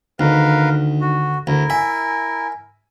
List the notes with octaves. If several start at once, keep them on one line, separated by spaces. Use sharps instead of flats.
D2 D3 D#3 A#4 B4 F5
F#4
D2 E4 A#4
E5 G#5